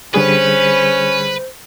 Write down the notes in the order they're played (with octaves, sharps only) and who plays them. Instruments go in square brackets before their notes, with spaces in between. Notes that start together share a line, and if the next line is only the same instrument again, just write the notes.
[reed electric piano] D3 G3 G#4 [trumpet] C#4 [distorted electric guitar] B4 [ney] C5